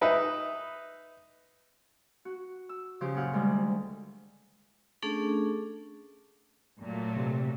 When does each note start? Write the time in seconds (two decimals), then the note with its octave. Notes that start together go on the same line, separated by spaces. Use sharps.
0.01 D#4 B4 E5
2.25 F#4
2.69 E6
3.01 C#3 F3 G4 C5
3.15 F#2 A#2 F#5 F6 G6
3.33 D2 D#3 G3 G#3
5.02 A3 C#4 D4 G#4 A4
6.82 A#2 F#3 A3
7.16 C3